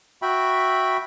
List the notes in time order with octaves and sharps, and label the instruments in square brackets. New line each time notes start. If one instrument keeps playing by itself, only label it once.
[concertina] F#4 E5 G5 B5